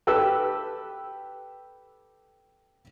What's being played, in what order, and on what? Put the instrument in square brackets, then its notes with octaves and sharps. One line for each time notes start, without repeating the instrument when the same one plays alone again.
[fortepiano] G4 A4 B4 E6